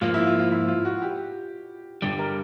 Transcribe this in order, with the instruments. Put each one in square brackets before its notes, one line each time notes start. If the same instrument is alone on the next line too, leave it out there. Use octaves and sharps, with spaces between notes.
[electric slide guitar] G#2 F3 A#3 [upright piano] F4
[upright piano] E4
F4
F4
E4
F4
F#4
G4
[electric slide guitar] G2 D3 G3 [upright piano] G4
[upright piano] A#4